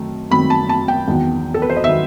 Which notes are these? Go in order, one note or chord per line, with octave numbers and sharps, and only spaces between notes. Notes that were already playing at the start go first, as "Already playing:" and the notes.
Already playing: F#2 D#3 A3 C4
F#2 D#3 A3 C4 B5
A5
A5
G5
E2 D#3 F#3 B3
A4
B4
C5
D#5
D#3 F#3 B3 E5